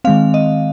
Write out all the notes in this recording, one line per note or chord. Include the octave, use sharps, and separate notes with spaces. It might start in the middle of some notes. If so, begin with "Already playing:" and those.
D#3 G#3 C4 F5
D#5